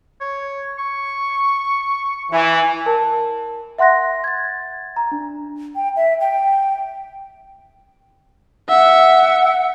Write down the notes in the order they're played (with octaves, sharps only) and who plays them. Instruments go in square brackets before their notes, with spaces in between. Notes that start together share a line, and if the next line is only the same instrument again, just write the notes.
[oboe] C#5
C#6
[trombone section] E3
[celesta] A#4 A5
E5 F#5 C6 F#6 A#6
G#6 A6
A#5
D4
[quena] G5
E5
G5
[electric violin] E5 [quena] F#5